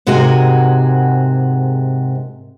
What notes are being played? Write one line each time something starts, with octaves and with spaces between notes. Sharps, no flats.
G#2 C3 G#3 F#4 A#4 G#5